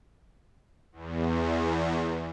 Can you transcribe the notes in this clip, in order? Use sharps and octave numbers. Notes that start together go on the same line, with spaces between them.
E2